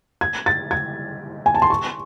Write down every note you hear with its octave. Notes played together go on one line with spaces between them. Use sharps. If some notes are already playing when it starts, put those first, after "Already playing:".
G#6
A6
G#6
G#5
A5
C6
C#6